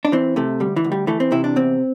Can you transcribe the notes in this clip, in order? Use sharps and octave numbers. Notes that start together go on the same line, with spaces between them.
D4
E3 C4
C3 A3
D2 G3
E3
D2
G3
E3 A3
C4
C3 E4
D4
E2 C4